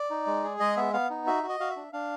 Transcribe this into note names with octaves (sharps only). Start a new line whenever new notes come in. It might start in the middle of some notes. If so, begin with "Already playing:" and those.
Already playing: D5
D#4
G#3
G#4
G#3 D#5
B3 E5
B3 F5
D#4
F#4 E5
F#4
D#5
F#4 F5
E5
D4
D4 F5